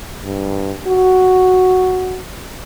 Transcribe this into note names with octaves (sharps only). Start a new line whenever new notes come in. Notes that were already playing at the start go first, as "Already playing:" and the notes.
G2
F#4